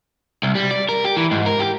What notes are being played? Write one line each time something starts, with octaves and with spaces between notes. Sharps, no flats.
C2
G3
D5
A#4
G4
E3
G#2
A#4
G4